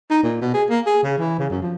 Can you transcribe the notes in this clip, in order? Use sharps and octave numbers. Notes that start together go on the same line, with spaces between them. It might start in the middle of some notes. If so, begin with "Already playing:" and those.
D#4
A#2
B2
G#4
A#3
G#4
C#3
E3
C#3
F#2
F3